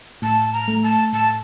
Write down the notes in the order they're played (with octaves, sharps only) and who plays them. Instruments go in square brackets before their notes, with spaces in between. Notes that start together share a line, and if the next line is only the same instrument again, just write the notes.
[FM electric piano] A2 [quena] A5
[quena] A#5
[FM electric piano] A3
[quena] A5
[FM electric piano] A2 [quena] A5